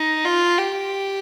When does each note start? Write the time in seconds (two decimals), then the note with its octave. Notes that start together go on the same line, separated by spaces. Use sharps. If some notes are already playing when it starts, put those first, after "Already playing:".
Already playing: D#4
0.25 F4
0.58 G4